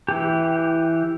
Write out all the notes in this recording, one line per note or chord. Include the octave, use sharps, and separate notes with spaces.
E3 G4